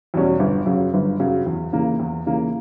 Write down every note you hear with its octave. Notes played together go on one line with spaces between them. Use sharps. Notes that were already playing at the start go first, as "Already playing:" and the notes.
E2 B2 G3 C#4
G1
F#2 C#3 F#3
G1
F#2 C#3 F#3
E2
C#3 E3 A#3
E2
C#3 E3 A#3